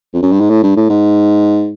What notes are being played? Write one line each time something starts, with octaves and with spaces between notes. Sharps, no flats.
F2
F#2
G2
G#2
A2
G2
A2
G#2